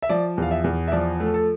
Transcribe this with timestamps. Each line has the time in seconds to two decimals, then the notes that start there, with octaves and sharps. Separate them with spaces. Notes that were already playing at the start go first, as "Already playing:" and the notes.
0.02 E5
0.09 F3 D5
0.38 E2 F5
0.51 E5
0.64 E2
0.88 E5
0.92 F3 D5
1.20 A3
1.34 A4